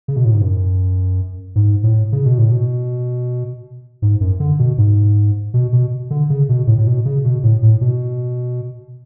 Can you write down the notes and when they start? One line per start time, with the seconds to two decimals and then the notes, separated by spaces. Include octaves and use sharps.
0.08 C#3
0.16 B2
0.25 A2
0.33 G#2
0.41 F#2
1.56 G#2
1.83 A2
2.12 C#3
2.25 B2
2.38 A2
2.51 B2
4.02 G#2
4.21 F#2
4.40 D3
4.59 B2
4.78 G#2
5.54 B2
5.73 B2
6.10 D3
6.30 C#3
6.49 B2
6.67 A2
6.78 A2
6.87 B2
7.05 C#3
7.24 B2
7.43 A2
7.63 A2
7.81 B2